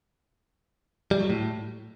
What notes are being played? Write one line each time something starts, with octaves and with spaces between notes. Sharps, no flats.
G3
F#3
A2